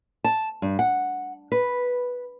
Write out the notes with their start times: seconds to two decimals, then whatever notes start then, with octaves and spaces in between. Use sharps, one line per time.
0.24 A5
0.62 G2
0.79 F#5
1.52 B4